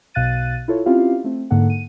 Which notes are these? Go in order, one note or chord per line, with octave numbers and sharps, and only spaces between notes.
B1 B2 F5 F#6 A6 D#7
E4 F4 A4 C#5
C4 C#4 E4 F4 G4 F5
A3 C4
G#2 D3 A#3 A4 F#5
D#7